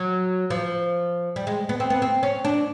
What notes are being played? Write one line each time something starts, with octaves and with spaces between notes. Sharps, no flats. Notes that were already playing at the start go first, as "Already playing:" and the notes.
Already playing: F#3
F3
G3
G#3
B3
C4
B3
C4
C#4
D4